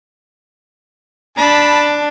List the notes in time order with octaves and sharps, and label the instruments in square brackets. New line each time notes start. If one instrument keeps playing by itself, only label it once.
[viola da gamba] D4 [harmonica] A5 B5